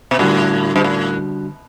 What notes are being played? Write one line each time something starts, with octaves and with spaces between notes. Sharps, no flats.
B2
A2 D3 G3 D4 F#4
G2
A2